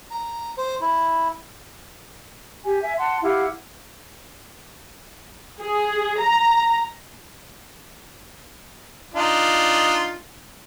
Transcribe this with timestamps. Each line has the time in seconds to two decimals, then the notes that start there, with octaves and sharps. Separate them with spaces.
0.11 A#5
0.58 C5
0.81 E4
2.64 G4 G#5
2.82 E5 G#5
2.97 F#5 A5 C6
3.22 E4 G4 F5 F#5
5.61 G#4
6.19 A#5
9.14 D4 D#4 F4